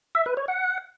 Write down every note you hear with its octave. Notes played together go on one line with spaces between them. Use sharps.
E5
B4
C#5
F#5